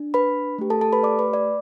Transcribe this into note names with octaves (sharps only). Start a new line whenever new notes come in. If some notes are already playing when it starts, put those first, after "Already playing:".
Already playing: D4
B4 B5
A3 G4
A4 A5
A4 A5
B4 B5
D5 D6
B4 B5
D5 D6